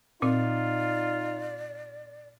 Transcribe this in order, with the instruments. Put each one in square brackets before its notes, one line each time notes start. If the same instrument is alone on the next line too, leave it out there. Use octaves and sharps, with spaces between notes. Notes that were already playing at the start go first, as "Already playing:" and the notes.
[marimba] A#2 C4 [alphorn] D#4 [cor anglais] F4 [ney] D5